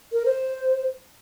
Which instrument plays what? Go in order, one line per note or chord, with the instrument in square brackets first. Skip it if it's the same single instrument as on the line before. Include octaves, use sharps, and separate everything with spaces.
[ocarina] A#4
C5